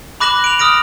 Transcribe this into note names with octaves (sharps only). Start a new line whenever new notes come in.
B5 D6 F#6 A#6 E7 F#7
D7 F7
D#6 F6 A#6 D7